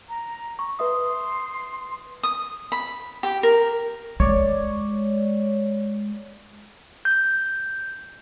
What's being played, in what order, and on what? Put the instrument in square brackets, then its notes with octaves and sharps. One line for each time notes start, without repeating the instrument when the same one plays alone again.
[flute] A#5
[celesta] C#6
[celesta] B4 E5 D#6 [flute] C6
[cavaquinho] D#6
B5
G4
A#4
[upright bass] G#3 [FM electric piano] C#5 D5
[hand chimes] G6